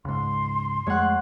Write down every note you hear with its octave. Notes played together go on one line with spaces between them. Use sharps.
C#2 G#2 C6
F2 G#3 A3 C#5 F#5